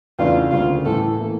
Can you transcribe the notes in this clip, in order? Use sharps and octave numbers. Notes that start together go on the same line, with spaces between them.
E2 C#3 E3 A3 D4 F4
D2 C#3 G3 A#3 F4
A2 E3 A3 A4
E3 A#3